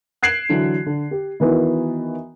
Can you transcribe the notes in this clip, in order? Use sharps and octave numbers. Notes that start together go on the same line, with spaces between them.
F#6 G#6 C7 D7 E7 F#7
D3 E3 F#3
D3
G4
D#3 E3 B3 E4 F#4